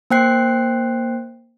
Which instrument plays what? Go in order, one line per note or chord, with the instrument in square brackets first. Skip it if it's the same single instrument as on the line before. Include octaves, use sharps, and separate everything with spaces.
[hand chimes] A#3 C5 G5 F#6 C7